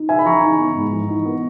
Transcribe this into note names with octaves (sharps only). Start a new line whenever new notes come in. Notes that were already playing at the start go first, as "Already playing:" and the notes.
Already playing: D#4
C#3 E5 G#5
B5
E3 A#5 C#6
D#4
B3
G#2
E3
D#4
B3